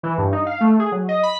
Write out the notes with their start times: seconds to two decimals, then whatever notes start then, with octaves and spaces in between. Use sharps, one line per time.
0.03 E3
0.18 G2
0.32 D#4
0.46 F5
0.61 A3
0.79 G#4
0.92 F#3
1.08 D#5
1.23 B5